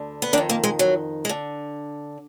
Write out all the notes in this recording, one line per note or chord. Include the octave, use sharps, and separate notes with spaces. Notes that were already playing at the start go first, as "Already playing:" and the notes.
Already playing: D2 D3
B3
F2 D#3 D4
A#3
G#3
F#3
G#3
D3